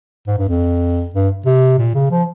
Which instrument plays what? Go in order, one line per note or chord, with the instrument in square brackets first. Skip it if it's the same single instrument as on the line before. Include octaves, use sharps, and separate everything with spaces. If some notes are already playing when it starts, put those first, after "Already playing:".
[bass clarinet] G#2
G2
F2
G2
C3
A#2
C#3
F3